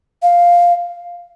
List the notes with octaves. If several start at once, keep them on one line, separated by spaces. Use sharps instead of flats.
F5